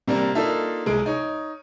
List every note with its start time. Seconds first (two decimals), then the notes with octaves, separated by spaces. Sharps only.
0.07 C3 G3 A#3 D4 A#4
0.35 A#3 D4 D#4 F4 A4 E5
0.86 C2 G#3 G#4 D7
1.06 D#4 C#5